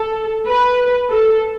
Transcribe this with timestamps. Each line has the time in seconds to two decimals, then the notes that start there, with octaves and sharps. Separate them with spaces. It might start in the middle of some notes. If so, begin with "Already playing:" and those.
Already playing: A4
0.47 B4
1.10 A4